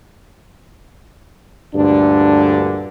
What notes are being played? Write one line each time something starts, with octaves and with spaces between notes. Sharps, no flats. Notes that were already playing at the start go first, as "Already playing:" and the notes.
D2 G2 A#2 D3 D4